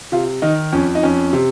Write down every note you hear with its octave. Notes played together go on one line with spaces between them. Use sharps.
C3 F4
D#3 D#4
F2 C#4
D#4
F2 C#4
C3